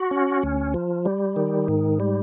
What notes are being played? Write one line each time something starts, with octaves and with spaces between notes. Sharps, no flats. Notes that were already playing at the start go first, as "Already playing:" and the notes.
Already playing: F#4
C#4
D2
F3
G3
D#3
G#2
G3